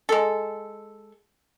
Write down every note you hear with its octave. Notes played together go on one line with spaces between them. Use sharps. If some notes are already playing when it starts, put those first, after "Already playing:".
G#3 A4